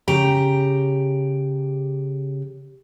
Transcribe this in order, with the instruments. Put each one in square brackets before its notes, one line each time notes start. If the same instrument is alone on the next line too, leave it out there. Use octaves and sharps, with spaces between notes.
[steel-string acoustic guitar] C#3 G4 A#5